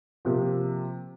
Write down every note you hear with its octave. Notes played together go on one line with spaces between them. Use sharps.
C3 F3 A#3